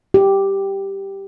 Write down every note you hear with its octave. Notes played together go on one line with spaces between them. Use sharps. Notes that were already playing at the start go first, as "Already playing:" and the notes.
G4